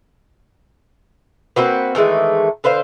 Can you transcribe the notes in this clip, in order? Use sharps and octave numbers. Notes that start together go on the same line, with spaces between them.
A#3 C4 F#4 B4
D#3 E3 G#3 A3
D3 B4 C5 F5